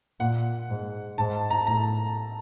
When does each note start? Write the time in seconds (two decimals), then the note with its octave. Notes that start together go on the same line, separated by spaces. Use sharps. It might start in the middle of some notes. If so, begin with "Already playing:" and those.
0.20 A#2 F#5
0.69 G#2
1.18 G#2 A5
1.50 A#5
1.67 A2 A#5